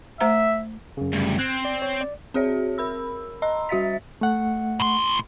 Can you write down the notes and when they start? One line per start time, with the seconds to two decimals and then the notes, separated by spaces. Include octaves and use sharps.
0.20 A3 C5 E5 A#5
0.97 F#2 C#3
1.12 D2 G2
1.38 C4 F#6 G#6
1.65 D5
1.82 C#5
2.01 D5
2.34 C4 F#4 G#4 C#5 E5
2.78 A#4 B5 E6
3.42 D#5 A#5 C6 E6
3.69 G3 F#4 E5 A6 B6
4.21 A3 F#5
4.80 A2 C6